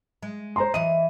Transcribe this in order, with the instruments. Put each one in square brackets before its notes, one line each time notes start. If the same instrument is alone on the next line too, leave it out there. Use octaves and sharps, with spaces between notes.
[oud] G#3
[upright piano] C5 A#5 C6
[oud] E3 D#5 [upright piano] D#7